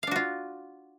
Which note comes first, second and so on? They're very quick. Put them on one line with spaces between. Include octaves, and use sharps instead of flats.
F5 D4 F#4 F4